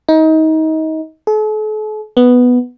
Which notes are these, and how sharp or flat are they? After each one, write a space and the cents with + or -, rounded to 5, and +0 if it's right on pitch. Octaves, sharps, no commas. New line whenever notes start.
D#4 +25
A4 -45
B3 +0